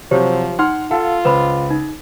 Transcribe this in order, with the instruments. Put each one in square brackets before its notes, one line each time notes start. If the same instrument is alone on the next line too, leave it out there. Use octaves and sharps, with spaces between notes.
[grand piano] C3 F#3 C4 [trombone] F3 [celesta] G4 C5 C#5
[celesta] D#4 [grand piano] F#5 C6 F6
[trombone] F4 [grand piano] A4 F5 [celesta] F#5
[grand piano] C#2 [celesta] B4 C5 B5
[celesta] D#4